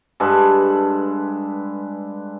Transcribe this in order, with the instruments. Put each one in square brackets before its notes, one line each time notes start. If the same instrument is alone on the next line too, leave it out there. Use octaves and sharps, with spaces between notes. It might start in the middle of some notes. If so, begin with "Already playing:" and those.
[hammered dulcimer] G2 G#3 A4 B4